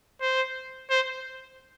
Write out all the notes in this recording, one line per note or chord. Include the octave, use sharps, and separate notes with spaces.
C5
C5